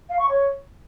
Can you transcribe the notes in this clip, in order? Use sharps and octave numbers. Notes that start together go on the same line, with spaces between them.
F5
C#6
C#5